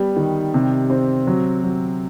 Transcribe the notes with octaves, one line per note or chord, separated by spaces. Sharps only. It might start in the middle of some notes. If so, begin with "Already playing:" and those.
Already playing: G3 B3
D#3
C3
C4
F#3
F#3